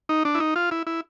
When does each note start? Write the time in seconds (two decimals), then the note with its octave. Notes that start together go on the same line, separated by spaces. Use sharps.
0.09 D#4
0.25 D4
0.35 E4
0.40 D#4
0.56 F4
0.71 E4
0.87 E4